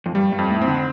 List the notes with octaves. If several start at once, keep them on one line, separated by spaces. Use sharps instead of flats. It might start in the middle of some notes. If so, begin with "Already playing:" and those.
F2
G2 G3
G2
F2
A2
C4
D3